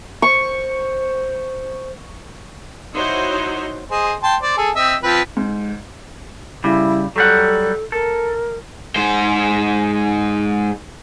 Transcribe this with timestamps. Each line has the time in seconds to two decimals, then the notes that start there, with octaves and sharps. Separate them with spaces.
0.22 C5 C#6
2.94 D#4 E4 F#4 C5 C#5
3.91 G#4 C5 D#5
4.23 G5 A5 C6
4.42 C5 D5
4.57 G#4 A4
4.75 C4 D#5 E5
5.03 F3 C4 B4
5.37 G#2
6.64 C#3 G3 E4
7.16 F#3 G3 A4 F#5
7.92 A4 A#4
8.96 G#2 C5